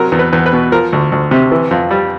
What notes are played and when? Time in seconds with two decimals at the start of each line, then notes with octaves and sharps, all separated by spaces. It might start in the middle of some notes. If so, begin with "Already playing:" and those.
Already playing: C3 F#3 A#4
0.12 E2
0.19 B4
0.33 E2
0.46 B4
0.53 B2
0.72 F3 A#4
0.93 D2
1.12 D2
1.31 C3
1.52 E3
1.71 F2
1.91 G3